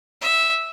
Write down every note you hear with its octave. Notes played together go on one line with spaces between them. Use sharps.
E5